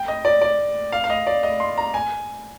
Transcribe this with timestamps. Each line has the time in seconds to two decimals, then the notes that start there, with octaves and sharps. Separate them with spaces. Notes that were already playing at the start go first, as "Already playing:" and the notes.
Already playing: G5
0.08 D#5
0.25 D5
0.42 D5
0.92 F5
1.04 F5
1.10 D#5
1.27 D5
1.43 D#5
1.60 C6
1.78 A#5
1.94 G#5